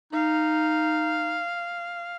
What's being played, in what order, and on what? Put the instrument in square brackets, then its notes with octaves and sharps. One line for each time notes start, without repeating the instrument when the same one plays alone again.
[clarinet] D#4 [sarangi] F5